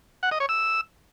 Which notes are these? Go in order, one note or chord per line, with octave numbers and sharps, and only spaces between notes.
F#5
D#5
C#5
E6